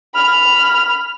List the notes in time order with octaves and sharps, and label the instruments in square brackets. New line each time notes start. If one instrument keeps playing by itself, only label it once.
[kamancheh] B5 F6